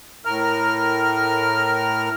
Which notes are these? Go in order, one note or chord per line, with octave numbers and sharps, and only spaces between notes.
A2 A#4 F6